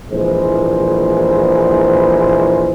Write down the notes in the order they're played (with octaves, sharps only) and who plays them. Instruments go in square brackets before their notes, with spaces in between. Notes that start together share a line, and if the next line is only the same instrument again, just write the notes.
[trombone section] A#1 E3 G#3 C5